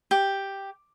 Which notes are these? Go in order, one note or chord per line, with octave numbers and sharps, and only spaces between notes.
G4